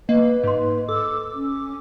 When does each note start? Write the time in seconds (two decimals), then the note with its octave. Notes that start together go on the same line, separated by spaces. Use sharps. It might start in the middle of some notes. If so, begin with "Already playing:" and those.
0.09 A#3 B4 D#5
0.44 G#2 D#5 C6
0.89 A4 D6 E6
1.34 C#4